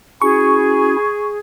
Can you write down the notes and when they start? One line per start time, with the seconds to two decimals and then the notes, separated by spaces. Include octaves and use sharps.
0.22 C#4 E4 F#4 G#4 C#6